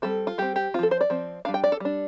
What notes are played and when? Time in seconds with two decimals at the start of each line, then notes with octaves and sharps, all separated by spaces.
0.02 G3 C4 A4
0.27 F4
0.38 G3 C4 G4
0.56 G4
0.74 C4 F4
0.79 F3 A4
0.91 C5
1.01 D5
1.10 F3 C4
1.45 G3 D4 F5
1.54 G5
1.64 D5
1.72 A4
1.80 G3 D4